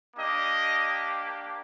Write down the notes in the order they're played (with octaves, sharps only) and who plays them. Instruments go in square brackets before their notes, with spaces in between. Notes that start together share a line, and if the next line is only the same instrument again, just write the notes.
[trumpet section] A#3 D4 G4 D#5